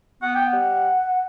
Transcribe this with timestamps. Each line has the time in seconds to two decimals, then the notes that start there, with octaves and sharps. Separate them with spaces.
0.23 B3 F#5
0.35 G5
0.47 F#5
0.53 G3